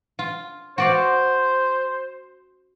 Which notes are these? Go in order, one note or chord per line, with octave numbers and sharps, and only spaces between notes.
F4
F#4 C5 D5 F5